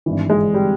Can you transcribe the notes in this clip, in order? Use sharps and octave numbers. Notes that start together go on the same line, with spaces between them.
G#1 G2 E3
G#3
G3